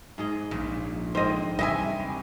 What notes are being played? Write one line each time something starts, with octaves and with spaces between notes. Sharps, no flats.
G#2 G#4 D#5
A#1 A#2 C#3
G#2 D3 C4 C5 D#5
C2 E3 G3 G#4 D#5 E5 G#5
C2